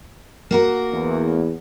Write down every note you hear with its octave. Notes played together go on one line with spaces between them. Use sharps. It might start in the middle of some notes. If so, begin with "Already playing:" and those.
A#3 F#4 A#4
E2